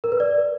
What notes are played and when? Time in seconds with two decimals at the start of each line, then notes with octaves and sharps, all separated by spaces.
0.04 A#4
0.12 B4
0.20 D5